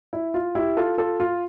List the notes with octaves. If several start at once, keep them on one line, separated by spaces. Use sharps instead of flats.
E4
F4
E4 G4
F4 A4
F4 A4
F4